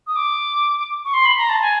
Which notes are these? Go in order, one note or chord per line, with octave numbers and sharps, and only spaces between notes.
D#6
D6
C#6
C6
B5
A#5
A5
G#5